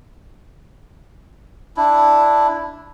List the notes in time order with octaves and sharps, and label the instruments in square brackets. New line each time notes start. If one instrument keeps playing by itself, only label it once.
[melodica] D4 E4